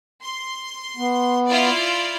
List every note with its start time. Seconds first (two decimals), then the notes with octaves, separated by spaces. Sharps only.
0.22 C6
0.97 B3
1.47 E4 F4 D5